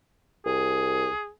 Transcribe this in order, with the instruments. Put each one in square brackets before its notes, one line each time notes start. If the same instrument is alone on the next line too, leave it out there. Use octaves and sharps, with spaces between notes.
[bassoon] C2 [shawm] G#4